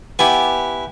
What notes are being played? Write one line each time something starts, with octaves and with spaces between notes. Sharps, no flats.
B3 E4 G4 G#5